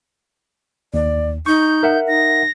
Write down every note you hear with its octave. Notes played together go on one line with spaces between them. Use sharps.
D#2 D5
D#4 C#6 G6
A#4 E5 F#5
D#4 A#6